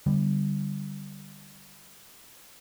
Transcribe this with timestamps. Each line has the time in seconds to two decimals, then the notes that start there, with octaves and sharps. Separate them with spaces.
0.06 D3 G3 B3